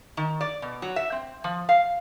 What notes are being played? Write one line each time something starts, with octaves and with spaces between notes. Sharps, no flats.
D#3
D5
B2
F#3
E5
C4
F3
F5